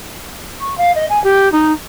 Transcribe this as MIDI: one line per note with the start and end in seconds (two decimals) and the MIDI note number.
0.61 0.77 85
0.78 0.92 77
0.95 1.06 75
1.10 1.21 80
1.24 1.51 67
1.52 1.73 63